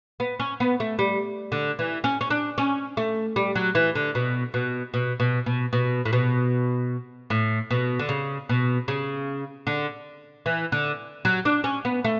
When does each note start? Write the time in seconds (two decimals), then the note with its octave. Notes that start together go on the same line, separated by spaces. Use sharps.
0.20 B3
0.40 C#4
0.60 B3
0.80 A3
0.99 G3
1.52 D3
1.79 E3
2.04 C#4
2.21 C#4
2.30 D4
2.58 C#4
2.97 A3
3.36 G3
3.55 F#3
3.75 E3
3.95 D3
4.15 B2
4.54 B2
4.94 B2
5.20 B2
5.46 B2
5.73 B2
6.05 A2
6.13 B2
7.30 A2
7.71 B2
7.99 D3
8.09 C#3
8.49 B2
8.88 C#3
9.67 D3
10.46 E3
10.72 D3
11.25 F#3
11.45 D4
11.64 C#4
11.85 B3
12.04 A3